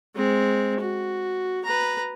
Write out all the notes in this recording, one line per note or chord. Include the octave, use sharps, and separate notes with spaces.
G#3 C4
F#4
B4 A#5